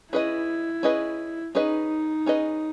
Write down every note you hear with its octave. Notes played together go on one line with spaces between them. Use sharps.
C#4 E4 G#4 B4 D#5
C#4 G#4 B4 D#5
C#4 D#4 G#4 B4 D#5
C#4 G#4 B4 D#5